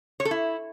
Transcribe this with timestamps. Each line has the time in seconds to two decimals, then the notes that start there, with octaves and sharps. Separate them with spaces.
0.20 C#5
0.25 A4
0.31 E4